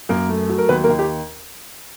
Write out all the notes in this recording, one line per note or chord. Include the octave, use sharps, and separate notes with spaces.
F#2 A#3 A#4
A3
F#3
A#4
D#2 B3 B4
A#3 A#4
D#2
G4